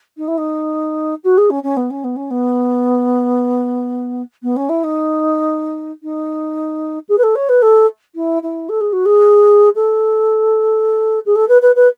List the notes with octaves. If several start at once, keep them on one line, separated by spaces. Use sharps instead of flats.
D#4
E4
D#4
F#4
G#4
C#4
C#4
B3
C#4
B3
C#4
B3
B3
C#4
E4
D#4
D#4
G#4
B4
A4
C#5
B4
A4
E4
E4
A4
G#4
F#4
G#4
A4
G#4
A4
B4
B4
B4